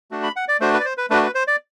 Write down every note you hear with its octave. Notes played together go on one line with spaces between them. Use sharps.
A3 D4 F#4
B5
F#5
D5
A3 D4 F#4 C5
B4
D5
C5
B4
A3 D4 F#4 B4
B4
C5
D5